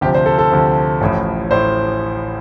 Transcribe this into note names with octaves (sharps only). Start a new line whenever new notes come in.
D2 C3 F3 G4
C5
A4
A4
D2 C3 F3
A1 A2 F3
A2 C5